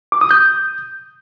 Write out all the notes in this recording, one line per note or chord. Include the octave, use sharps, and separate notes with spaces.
D6
D#6
G6